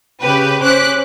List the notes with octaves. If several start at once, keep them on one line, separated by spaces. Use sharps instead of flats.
C#3 G4 B4
C#4 C5 D6 F#6 B6